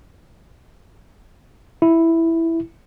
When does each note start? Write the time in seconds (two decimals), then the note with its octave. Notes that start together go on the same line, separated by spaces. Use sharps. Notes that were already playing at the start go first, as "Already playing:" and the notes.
1.82 E4